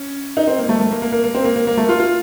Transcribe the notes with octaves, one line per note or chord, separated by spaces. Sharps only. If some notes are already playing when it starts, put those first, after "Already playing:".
Already playing: C#4
D#4
C4
A#3
A3
A3
A#3
A#3
A#3
A#3
C4
A#3
A#3
A#3
A3
F4
F4